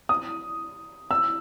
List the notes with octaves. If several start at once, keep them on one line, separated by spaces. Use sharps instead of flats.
D#6
E6